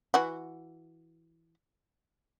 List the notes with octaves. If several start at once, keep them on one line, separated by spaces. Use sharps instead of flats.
E3 F#4